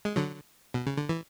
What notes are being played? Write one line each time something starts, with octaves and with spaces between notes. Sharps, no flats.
G#3
D3 F#3
B2
C#3
D3
E3